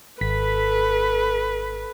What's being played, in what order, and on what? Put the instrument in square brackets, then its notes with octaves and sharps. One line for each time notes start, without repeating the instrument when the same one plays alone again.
[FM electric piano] G#1 B6 [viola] A4 B4